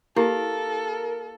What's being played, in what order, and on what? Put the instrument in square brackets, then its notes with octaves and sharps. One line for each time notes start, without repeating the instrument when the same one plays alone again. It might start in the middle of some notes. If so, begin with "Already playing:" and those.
[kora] A#3 [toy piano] E4 G4 [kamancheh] A4 [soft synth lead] A#4